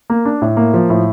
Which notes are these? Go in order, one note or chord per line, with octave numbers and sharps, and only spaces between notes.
A#3
D4
A2
A#3
F3
A2